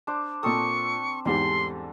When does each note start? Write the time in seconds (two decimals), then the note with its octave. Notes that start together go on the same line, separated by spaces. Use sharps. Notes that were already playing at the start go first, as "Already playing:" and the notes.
0.07 D4 C5 D6
0.43 A#2 C4 A4 C#6 D#6
1.25 E2 G#2 G3 G4 C6